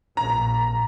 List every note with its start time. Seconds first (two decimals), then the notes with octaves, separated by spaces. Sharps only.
0.17 A#1 A#2 A#5